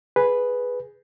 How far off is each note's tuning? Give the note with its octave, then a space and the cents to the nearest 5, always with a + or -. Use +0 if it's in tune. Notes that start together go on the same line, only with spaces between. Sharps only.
G#4 +0 B4 +0